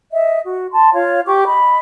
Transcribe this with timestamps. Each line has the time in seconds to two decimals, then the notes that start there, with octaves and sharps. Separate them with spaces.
0.12 D#5 E5
0.44 F#4
0.72 A5 C6
0.94 F4 C#5 F5
1.25 G4 C#6 D6
1.45 D#5 B5